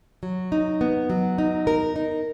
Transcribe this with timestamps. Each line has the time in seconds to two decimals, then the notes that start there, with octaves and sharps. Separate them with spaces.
0.23 F#3
0.52 D#4
0.81 B3
1.10 F#3
1.38 D#4
1.67 A#4
1.96 D#4